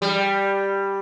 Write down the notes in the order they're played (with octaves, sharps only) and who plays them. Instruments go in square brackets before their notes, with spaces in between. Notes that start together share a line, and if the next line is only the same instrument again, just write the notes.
[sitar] G3